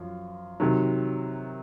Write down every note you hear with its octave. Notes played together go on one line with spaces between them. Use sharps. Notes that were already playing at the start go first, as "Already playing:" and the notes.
Already playing: F#2 F3
C3 D#3 F#3